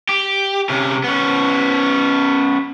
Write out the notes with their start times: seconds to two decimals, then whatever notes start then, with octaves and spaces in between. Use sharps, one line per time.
0.09 G4
0.69 C3 C#4
1.04 B3 C#4